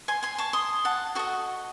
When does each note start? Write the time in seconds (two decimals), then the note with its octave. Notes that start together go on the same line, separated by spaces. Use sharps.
0.08 G#5 C6
0.23 G#5 C6
0.38 A5 C#6
0.53 C6 D#6
0.85 F#5 A5
1.15 F#4 A4 D#5 C#6